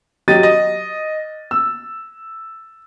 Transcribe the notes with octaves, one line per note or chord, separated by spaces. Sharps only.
F#3 G4 D#5 A6 D#7
D#5
E6